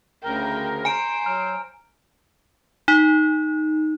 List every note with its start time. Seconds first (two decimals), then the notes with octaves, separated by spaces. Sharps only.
0.24 D2 C#3 A#4 G5
0.85 C5 G#5 A#5 D7
1.26 F#3 A#5 F6
2.88 D#4